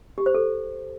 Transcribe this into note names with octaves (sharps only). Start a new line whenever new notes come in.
G4
C5
A4